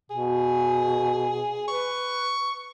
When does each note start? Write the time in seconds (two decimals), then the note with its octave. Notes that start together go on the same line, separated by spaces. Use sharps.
0.10 B2 G#4
1.68 B4 C#6